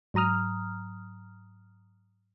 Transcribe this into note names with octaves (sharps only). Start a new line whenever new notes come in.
G#2 F#3 A#5 D#6 F6